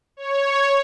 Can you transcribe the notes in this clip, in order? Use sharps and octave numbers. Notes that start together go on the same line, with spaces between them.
C#5